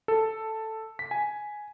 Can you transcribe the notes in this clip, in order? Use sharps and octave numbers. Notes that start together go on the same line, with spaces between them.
A4
B6
G#5